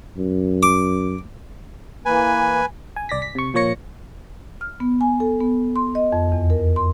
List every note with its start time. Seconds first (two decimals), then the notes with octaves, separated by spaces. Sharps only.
0.18 F#2
0.63 D6
2.06 E3 A#3 B4 G#5
2.96 G#5
3.09 C2 D5 A#6 B6
3.22 B6
3.35 C3 C#6
3.54 A#2 F3 A#3 C#5 A#6 C#7
4.61 F6
4.80 B3
5.01 G#5
5.20 A4
5.41 B3
5.76 C6
5.95 D#5
6.12 F2
6.32 E2
6.50 A#4
6.76 C6